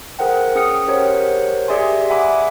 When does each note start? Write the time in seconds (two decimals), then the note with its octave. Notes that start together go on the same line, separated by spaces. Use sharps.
0.19 G#4 A#4 C5 F#5 G5
0.55 C#4 G#4 G5 D#6 F6 C#7
0.88 G4 A#4 C5 C#5 F#5
1.68 G4 G#4 D5 E5 G#5 C6
2.10 E5 F#5 G#5 B5 D6